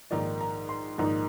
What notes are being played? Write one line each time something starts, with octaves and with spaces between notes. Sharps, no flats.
A#1 G#2 D#3 A#3 D#4 D5
A#5
C6
A#1 G#2 D#3 A#3 D#4